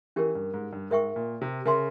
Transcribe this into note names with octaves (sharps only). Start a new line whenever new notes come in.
E3 C#4 G4 A#4
G2
G#2
G2
G#2 A#4 E5 G5 C#6
A#2
C3
C#3 A#4 E5 G#5 C6